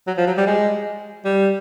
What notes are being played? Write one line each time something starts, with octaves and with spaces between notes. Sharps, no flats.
F#3
F3
F#3
G3
G#3
G3